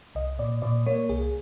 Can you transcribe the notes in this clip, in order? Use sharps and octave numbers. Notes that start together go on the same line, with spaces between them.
C2 D#5
A#2 D5
A#2 D5
A#3 C#5
C2 G#4